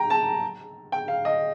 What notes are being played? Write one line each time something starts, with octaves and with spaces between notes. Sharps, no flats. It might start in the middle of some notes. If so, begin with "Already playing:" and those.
Already playing: G5 A#5
A5
G5
F5
D#5